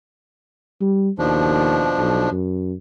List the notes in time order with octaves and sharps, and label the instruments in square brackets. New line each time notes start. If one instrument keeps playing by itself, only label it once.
[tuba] G3
[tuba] D#2 [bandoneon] B2 F3 D4
[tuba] B1
F#2